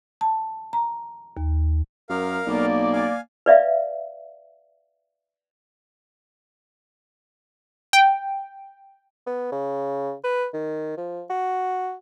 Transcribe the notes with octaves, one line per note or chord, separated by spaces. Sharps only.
A5
A#5
D#2
F#2 A#4 F5
B1 A#3 D5
F5 G#5
B4 D5 E5 F5
G5
B3
C#3
B4
D#3
F3
F#4